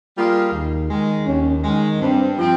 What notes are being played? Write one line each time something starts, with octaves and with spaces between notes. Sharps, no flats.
G3 A#3 F4 G#4
D#2
D#3 G#3
D#2 C#4
D#3 G#3
G2 C4
F3 C4